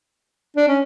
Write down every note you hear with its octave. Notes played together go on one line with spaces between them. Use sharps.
D4
C#4